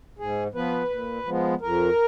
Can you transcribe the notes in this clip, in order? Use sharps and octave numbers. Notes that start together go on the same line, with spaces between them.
G#2 G#4
F3 B3 B4
A#2
F3 G#3 B3
F2 A#4